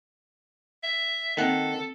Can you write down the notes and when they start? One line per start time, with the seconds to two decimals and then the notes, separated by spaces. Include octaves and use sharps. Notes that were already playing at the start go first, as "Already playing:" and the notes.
0.83 E5
1.37 D#3 A#3 C4 A4 D#5 F#5